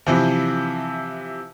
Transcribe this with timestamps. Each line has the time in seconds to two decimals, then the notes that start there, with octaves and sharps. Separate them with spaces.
0.06 C3 E3 F3